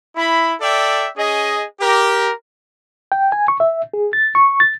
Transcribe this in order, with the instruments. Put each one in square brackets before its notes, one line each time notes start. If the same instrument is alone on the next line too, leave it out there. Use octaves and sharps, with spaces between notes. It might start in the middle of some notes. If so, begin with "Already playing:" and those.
[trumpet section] E4 B5
A4 D5 E5 G5
C#4 G#4 D#5
G4 A#4
[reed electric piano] G5
G#5
C#6
E5
G#4
A6
C#6
A6